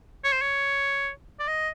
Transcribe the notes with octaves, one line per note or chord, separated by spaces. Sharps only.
C#5
C5
C#5
D5
D#5